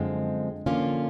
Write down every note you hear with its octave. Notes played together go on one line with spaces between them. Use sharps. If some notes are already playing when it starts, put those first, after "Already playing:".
Already playing: F#2 D3 F3 G#3 C4
D3 F3 A#3 C#4 F4